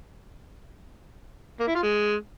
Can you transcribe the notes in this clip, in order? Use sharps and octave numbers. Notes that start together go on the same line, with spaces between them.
A#3
E4
F4
G#3